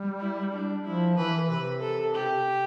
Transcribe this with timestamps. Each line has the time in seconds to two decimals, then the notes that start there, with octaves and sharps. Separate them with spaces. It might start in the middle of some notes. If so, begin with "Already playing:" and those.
Already playing: G3
0.21 E4
0.53 D4
0.85 F3 E4
1.16 E3 B4
1.49 C3 B4
1.81 A4
2.14 G4